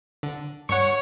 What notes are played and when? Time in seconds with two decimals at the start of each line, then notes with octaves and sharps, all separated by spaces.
0.23 D3
0.69 G2 C#5 F#5 C#6